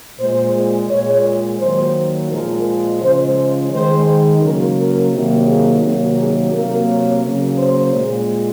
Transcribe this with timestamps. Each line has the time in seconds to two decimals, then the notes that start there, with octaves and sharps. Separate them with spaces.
0.19 A#2 G#3 C5
0.90 A#2 G#3 C#5
1.60 D#3 F#3 A#3 C5
2.31 A#2 F3 G#3 A#4
3.01 C#3 F3 G#3 C5
3.36 C5
3.71 D#3 G#3 C5
4.42 C#3 F#3 A#3 A#4
4.77 A#4
5.12 C3 D#3 F#3 A#3
5.47 G#4
5.82 C3 D#3 F#3 A#3
6.17 G#4
6.53 C3 F#3 A#3 A#4
6.88 C#5
7.23 C#3 F#3 A#3
7.58 C5
7.93 A#2 G#3